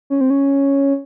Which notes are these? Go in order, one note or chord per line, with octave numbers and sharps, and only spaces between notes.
C#4
C4
C#4